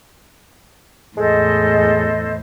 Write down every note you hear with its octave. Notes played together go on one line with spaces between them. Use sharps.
E2 A2 G#3 A4 C5 D#5